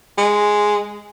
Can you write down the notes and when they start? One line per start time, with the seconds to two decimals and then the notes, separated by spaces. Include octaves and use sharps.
0.18 G#3